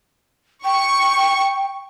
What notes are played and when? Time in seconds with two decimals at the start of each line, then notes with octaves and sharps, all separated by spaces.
0.64 G5 C#6